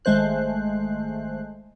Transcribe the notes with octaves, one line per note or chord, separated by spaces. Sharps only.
G#1 G#3 A3 C5 F#6